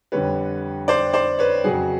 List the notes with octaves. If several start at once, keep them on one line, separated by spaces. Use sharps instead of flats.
F2 D3 G3 B4 C#5
C5 D5
C5 D5
B4 C#5
F2 C#3 F#3 F#4 G#4